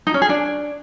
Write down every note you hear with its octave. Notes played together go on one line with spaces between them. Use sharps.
D#4
C#4
G#4
D4